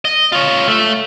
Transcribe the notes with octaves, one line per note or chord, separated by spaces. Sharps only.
D#5
F4 C#5
A3